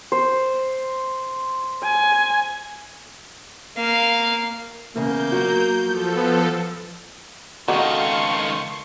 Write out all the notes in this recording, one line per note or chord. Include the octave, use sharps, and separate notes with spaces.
C5
G#5
A#3 F5
E2 C#3 A#3 G6
F#3 F#4
F3 A4
B3
C#2 D#3 G#3 F#4 A4 F5 C6 C#6